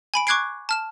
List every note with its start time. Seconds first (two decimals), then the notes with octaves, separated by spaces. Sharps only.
0.14 G#5 B5 D7
0.27 C#6 D6 F#6 G#6 C7 D7
0.69 A5 F6 E7